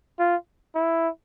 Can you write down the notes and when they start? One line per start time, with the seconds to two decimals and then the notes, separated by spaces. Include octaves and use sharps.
0.19 F4
0.75 E4